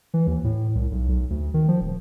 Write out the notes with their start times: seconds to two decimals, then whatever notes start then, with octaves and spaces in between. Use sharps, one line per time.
0.14 E3
0.27 D#2
0.44 A2
0.75 C2
0.91 B1
1.09 B1
1.30 D2
1.54 D#3
1.68 F3
1.80 D#1